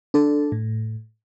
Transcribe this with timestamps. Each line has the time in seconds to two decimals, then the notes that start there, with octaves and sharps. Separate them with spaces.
0.14 D4 A4
0.52 A2